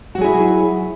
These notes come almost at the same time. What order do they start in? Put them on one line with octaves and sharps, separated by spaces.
F#4 F#3 G#4 E4